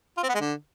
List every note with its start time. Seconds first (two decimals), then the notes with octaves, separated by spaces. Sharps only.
0.17 F4
0.23 C4
0.29 B3
0.35 G#3
0.40 D3